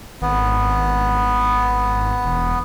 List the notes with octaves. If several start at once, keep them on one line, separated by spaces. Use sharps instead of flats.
G#1 B3
E1